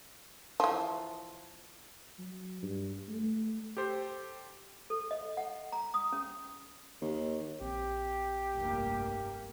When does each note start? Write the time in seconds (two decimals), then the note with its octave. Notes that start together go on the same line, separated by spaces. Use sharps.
0.60 E3 F3
2.19 F#3
2.63 G2
3.09 A3
3.77 G4 A4 C5
4.90 A4
5.11 D#5
5.37 F#5
5.72 A#5
5.94 D#6
6.13 C#4
7.01 D#2
7.61 A#1 C4 G4
8.55 F1 G2 A#3